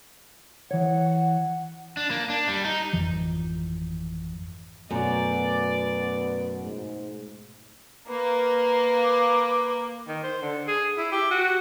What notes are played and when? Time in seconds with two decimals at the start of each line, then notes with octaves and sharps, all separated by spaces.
0.71 E3 C#5 F#5
1.97 D4
2.11 A#3
2.30 D4
2.48 G3
2.65 D#4
2.93 G#1 F2 E3 F3
4.91 F#2 B2 A3 B3 D5
6.60 G#2
8.09 A#3 B4
9.03 D6
10.07 D#3
10.23 C5
10.42 D3
10.68 G#4
10.98 E4
11.12 G4
11.31 F#4